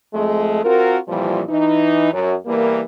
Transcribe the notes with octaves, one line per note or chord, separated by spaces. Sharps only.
F2 G#3 A3
C4 F4 F#4 A#4
F2 A#2 E3 F3 G3
E3 D#4
F#2
E2 E3 G3 A#3